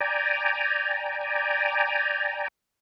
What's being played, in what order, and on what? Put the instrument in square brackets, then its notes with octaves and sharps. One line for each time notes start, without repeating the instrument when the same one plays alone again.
[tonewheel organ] D5 G5 G#5 A#5